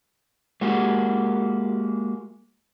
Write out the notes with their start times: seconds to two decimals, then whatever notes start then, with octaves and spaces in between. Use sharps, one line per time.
0.61 G#3 A#3 F#4 G4